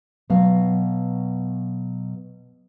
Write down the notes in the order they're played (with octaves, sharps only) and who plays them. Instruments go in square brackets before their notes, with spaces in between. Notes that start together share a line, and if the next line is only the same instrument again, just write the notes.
[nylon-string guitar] B2 F#3 B3 F5